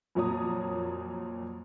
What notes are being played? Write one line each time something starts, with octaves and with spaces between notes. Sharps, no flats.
F2 A#2 F#3 C#5 A#5 D#6